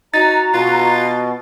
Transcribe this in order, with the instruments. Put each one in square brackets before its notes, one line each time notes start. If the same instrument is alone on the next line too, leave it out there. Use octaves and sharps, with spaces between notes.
[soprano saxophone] D#4 [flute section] F#4 A#5 [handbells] A6
[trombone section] B2 [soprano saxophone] F4